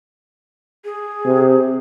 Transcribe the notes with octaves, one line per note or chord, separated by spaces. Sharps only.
G#4
C3